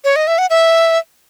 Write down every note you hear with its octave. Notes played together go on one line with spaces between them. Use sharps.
C#5
D#5
E5
F#5
E5